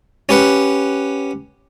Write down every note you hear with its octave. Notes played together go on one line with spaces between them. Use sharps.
C#4 G4 B4 F#5